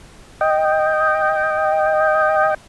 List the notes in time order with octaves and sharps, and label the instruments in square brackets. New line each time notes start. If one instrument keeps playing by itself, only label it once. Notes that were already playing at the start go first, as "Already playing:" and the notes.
[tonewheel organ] D#5 G5